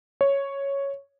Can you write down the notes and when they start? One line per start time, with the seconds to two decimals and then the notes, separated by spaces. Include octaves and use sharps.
0.21 C#5